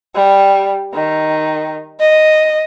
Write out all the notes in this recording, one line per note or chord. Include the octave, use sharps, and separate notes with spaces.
G3
D#3
D#5